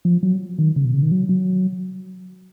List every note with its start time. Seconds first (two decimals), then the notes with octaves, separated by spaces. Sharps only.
0.05 F3
0.23 F#3
0.59 D#3
0.76 C#3
0.85 B2
0.94 C#3
1.02 D#3
1.12 F#3
1.29 F#3